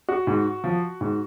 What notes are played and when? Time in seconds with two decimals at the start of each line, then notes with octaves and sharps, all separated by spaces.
0.09 F#4
0.27 G#2
0.64 F3
1.01 G#2